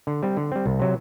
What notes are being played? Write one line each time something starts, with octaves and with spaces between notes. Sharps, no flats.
D3
G3 C4
D3
G3 C4
C2
C3 F#3